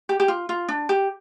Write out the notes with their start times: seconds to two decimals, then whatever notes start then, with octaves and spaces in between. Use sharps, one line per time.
0.09 G4
0.20 G4
0.28 F4
0.49 F4
0.68 D4
0.89 G4